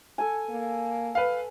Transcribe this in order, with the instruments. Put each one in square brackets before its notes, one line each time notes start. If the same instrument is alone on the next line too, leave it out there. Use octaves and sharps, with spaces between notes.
[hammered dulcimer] A4 G#5
[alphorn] A#3
[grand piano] B4 F5